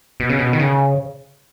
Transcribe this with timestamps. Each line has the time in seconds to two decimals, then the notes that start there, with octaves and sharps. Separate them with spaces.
0.20 B2
0.29 C#3
0.39 B2
0.53 D#3
0.60 C#3